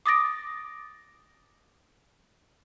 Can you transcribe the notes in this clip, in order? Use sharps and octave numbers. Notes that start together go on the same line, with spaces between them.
D6 D#6 A6 A#6 D7